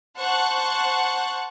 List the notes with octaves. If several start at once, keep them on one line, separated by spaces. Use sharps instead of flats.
C5 F#5 A5 C#6 F#6